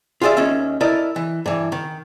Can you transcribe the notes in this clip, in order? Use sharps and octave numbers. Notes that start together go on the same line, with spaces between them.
F4 G4 G#4 D5 E5
D#2 D#3 C#4 E5
E4 A4 A#4 D5 D#5
E3
G2 E3
D#3